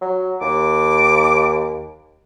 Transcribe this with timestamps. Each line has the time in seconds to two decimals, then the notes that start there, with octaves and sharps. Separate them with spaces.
0.01 F#3
0.41 D#2 D6